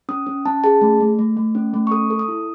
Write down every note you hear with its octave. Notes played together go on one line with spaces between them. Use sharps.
C#4 D#6
C#4
C#4 A5
G#4 A5
A3
A3
A3
A3
C#4
A3
C#6
A4 D#6
A4
D#6
E4